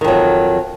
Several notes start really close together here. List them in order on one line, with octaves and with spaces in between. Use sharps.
D#3 F2 F#3